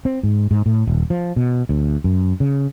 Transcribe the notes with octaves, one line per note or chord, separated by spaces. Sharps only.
C4
G#2
G#2
A2
D#1
F3
B2
D2
F#2
C#3